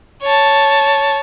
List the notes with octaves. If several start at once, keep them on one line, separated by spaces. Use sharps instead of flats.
C#5 A5